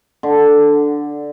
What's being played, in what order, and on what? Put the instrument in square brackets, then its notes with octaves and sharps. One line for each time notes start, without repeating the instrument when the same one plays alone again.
[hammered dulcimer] D3